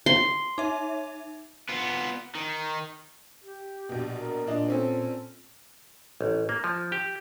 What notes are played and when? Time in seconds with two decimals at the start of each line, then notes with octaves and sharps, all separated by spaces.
0.06 C6
0.58 D#4 E5
1.69 B3 F4
2.35 D#3
3.43 G4
3.89 A#1 B2
4.17 A#4
4.47 A#2 A#3 D4 D#5
4.69 C4 C#4 A4
6.21 A1
6.49 A#3
6.64 F3
6.92 G4